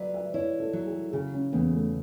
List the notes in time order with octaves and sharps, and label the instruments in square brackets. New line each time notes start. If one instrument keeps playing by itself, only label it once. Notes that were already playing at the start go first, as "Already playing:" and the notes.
Already playing: [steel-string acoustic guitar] F#3 B4 [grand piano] D5
[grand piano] E5
[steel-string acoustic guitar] E4 [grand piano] C#5
[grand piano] A4
[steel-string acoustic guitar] F#3
[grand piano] G#4
[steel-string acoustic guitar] C#3 [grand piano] G#4
[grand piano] C#4
[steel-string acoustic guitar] E2 [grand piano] B3
[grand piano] A3